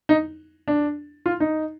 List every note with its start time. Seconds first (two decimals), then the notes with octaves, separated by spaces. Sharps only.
0.09 D#4
0.68 D4
1.26 F4
1.40 D#4